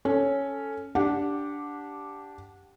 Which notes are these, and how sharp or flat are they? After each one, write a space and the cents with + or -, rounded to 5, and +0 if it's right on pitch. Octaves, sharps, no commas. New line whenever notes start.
C#4 +0 A4 +0
D4 -10 G4 +0 F#5 -20